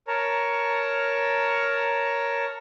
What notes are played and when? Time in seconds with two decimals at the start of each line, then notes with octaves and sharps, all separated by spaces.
0.08 A#4 C#5 A5 A#5